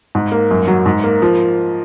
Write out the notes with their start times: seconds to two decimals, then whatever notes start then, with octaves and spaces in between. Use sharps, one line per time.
0.15 G#2
0.32 A#3
0.51 F#2
0.68 F#3
0.86 G#2
1.04 A#3
1.22 F3